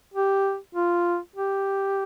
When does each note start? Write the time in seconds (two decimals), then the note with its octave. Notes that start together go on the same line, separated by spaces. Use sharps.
0.14 G4
0.75 F4
1.36 G4